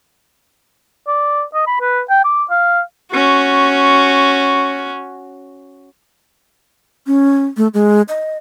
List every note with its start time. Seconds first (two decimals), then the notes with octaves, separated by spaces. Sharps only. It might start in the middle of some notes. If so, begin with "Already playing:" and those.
1.08 D5
1.54 D#5
1.67 B5
1.81 B4
2.10 G5
2.25 D6
2.50 F5
3.12 C#4 F#4
7.07 C#4
7.57 A3
7.74 G#3
8.09 D#5